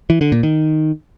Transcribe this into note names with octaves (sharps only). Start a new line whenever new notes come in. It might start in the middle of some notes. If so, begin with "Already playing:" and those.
E3
D3
A#2
D#3